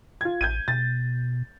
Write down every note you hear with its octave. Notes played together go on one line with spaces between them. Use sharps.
F4 G#6
A1 G6 G#6 D#7
B2 A6